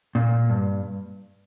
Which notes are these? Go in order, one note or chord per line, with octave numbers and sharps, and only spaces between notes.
A#2
G2